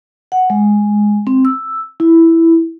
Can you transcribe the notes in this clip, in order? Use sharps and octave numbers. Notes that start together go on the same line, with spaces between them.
F#5
G#3
C4
E6
E4